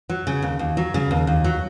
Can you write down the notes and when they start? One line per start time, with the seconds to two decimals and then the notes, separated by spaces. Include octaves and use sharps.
0.10 F#3
0.27 C#3
0.42 D#2
0.59 D#2
0.77 F#3
0.94 C#3
1.11 D#2
1.27 D#2
1.44 F#3